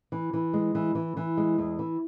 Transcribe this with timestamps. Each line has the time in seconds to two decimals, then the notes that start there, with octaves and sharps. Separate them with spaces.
0.12 E3
0.33 E3
0.53 G#3
0.75 E3
0.95 E3
1.17 E3
1.37 G#3
1.58 E2
1.79 E3